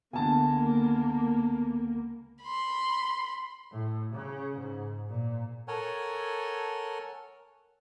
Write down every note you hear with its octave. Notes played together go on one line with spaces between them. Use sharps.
C#2 D3 A#3 B3 G#5 A5
B5 C6
A2
C#3
G#2
A#2
A4 A#4 C#5 F#5 G#5